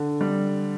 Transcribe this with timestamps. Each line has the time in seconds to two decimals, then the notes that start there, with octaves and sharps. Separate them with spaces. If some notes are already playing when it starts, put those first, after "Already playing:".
Already playing: D3
0.21 G3